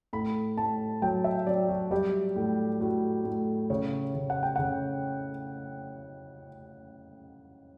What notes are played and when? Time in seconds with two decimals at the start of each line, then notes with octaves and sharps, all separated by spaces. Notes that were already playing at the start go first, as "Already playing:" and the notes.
0.13 A2 B5
0.57 A2 A5
1.02 F#3 G5
1.24 E5
1.47 F#3 D5
1.69 F#4
1.91 G3 G4
2.36 A2
2.81 A2 F#4
3.25 A2
3.70 C#3 C#5
4.15 C#3
4.30 F#5
4.43 G5
4.56 C#3 F#5